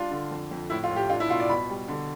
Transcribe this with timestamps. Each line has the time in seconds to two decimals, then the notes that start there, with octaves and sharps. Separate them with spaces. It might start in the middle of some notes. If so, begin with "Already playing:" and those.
Already playing: G3 D4 F4
0.11 D3
0.31 F2
0.51 F2
0.70 A2 E4
0.83 F4
0.90 A2
0.96 G4
1.09 D4 F4
1.20 E4
1.29 B2 F4
1.40 D5
1.49 B2 B5
1.69 G3
1.88 D3